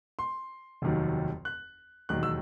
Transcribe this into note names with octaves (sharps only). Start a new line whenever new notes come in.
C6
F1 D#2 D#3 F#3
F#6
E1 D#2 D#3 F#3 F#6
E6